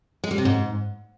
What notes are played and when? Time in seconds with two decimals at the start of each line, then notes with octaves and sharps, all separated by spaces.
0.24 G#3
0.31 G3
0.38 C3
0.45 G#2